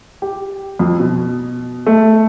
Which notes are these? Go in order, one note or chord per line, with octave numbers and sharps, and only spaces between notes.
G4
F2
B2
A3